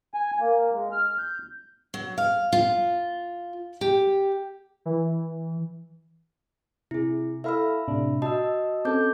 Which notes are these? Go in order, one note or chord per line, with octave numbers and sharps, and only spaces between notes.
G#5
A#3
G#3
F6
G6
F#3
F5
F4
G4
E3
C3 E4 G#4
E4 A4 E5 F5 B5 E6
A2 C3 D4
F#4 D#5 A5 E6
C4 C#4 A4 D6 G6